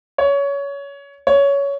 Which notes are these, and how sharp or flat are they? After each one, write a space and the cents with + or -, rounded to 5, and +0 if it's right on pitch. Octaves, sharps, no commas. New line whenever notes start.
C#5 +20
C#5 +15